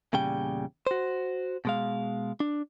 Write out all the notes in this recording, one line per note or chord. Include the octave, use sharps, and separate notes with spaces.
E2 A#2 C#3 G3 G5
F#4 C5
B2 G#3 F5
D4